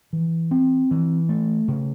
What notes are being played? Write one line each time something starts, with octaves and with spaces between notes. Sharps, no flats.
E3
C4
E3
A3
C#3